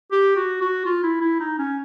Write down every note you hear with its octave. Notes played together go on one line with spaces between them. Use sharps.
G4
F#4
F#4
F4
E4
E4
D#4
C#4